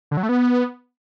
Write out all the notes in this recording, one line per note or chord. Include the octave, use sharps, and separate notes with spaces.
D3
F#3
A3
B3